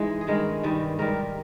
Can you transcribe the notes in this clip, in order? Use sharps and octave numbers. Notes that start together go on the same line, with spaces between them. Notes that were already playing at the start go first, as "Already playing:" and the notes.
Already playing: G#2 E3 G#3
G#4
G2 D#3 G#3 A#4
G2 D#3 G3
G#2 D#3 G3 A#4